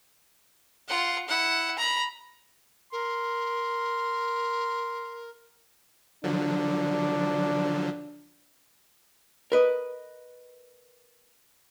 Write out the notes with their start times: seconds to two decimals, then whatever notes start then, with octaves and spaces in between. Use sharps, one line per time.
0.89 F4 F#5
1.28 E4 F#5
1.78 A#5 B5
2.92 A#4 C6
6.24 D3 F3 F#3 D4
9.52 A#4 B4 D#5